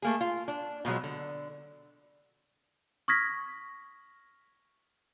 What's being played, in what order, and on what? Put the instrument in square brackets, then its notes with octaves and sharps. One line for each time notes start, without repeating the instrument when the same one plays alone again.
[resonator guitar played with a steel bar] A3 A#3 G#4
F4
D4
B2 F3 F#3 G#3
D3
[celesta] C#6 D#6 F6 G#6 A#6 B6